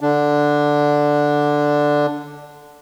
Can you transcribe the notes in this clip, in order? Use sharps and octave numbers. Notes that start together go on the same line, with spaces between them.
D3 D4